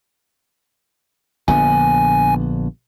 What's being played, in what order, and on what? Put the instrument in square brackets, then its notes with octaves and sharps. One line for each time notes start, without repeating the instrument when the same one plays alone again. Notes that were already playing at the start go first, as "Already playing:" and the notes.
[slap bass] A#1 D3 B3 [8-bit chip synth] G#5